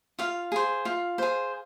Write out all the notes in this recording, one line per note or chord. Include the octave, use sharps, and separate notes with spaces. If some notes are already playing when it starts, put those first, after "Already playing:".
F4 F5
G#4 C5
F4 F5
G#4 C5